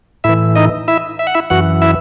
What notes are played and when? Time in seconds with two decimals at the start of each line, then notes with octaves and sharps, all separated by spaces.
0.24 A2 E3 E4 E5
0.55 D#4 D#5
0.88 E4 E5
1.19 E5
1.27 F#5
1.35 E4 E5
1.50 F#2 E3 F#4 F#5
1.82 E4 E5